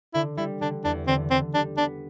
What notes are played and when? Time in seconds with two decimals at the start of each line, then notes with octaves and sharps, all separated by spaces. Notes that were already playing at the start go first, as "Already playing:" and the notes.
0.14 D3 E4
0.37 G3 E4
0.61 D3 D4
0.84 E2 D4
1.07 D3 C4
1.30 D3 C4
1.54 G3 D4
1.78 B3 D4